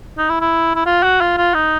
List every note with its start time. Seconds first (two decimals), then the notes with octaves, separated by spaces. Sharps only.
0.18 D#4
0.29 E4
0.41 E4
0.75 E4
0.86 F4
1.03 F#4
1.20 F4
1.37 F4
1.54 D#4